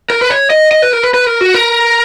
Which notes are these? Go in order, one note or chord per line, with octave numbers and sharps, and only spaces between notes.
A#4
B4
C#5
D#5
D#5
B4
A#4
B4
B4
A#4
F#4
A#4